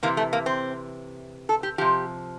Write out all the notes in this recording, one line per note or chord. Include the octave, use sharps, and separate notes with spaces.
C3 E3 A#3
A3
A#3
C4
A4
G4
C3 F3 G4